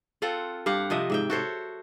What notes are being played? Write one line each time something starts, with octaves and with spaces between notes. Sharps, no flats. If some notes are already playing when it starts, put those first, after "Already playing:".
C4 F4 A4 F#5
G2 G4 F5 F#5
C3 F3 D#5 E5
G#2 E5 G5
F#4 A4 C5 C#5